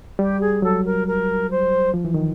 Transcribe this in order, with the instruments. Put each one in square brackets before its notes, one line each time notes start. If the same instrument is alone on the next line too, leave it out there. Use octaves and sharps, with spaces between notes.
[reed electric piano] G3 [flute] G4
[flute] G#4
[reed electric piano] F#3 [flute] A4
[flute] A#4
A#4
C5
[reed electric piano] F3
E3
D#3